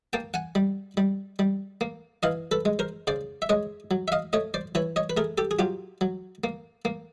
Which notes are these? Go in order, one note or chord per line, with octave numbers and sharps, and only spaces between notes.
A#3 G5 A5
F#5 G#5
G3
G3
G3
A#3
E3 D#5 F5
A4 B4
G#3
A#4 C5
C#3 C5 D5
E5
G#3 C#5 D#5
F#3
E5
D#5 F5
A3 C#5 D#5
C5 D5
E3 B4 C#5
C#5 D#5
B4
A3 G#4 A#4
G4 A4
G#4
F#3 F4 G4
F#3
A#3
A#3